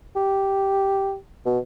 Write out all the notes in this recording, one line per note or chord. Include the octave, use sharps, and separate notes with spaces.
G4
B2